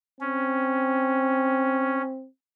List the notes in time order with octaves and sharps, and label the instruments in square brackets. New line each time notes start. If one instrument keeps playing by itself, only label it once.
[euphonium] C4 [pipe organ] C#4